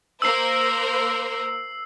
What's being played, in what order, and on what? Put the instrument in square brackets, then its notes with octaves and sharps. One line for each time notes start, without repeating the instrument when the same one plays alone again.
[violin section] A#3 A#4 C5 [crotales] E6 C7